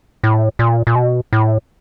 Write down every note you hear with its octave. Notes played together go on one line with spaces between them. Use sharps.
A2
A#2
A#2
B2
A2